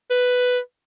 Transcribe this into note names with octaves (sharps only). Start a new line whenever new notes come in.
B4